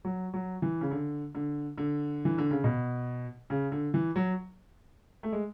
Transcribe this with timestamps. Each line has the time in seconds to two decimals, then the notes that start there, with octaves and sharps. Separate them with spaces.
0.05 F#3
0.34 F#3
0.62 E3
0.81 C#3
0.91 D3
1.35 D3
1.78 D3
2.25 E3
2.38 D3
2.51 C#3
2.64 B2
3.50 C#3
3.72 D3
3.94 E3
4.16 F#3
5.23 A3
5.32 G#3